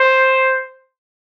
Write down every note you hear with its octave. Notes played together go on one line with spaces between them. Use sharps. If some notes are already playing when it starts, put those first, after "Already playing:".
Already playing: C5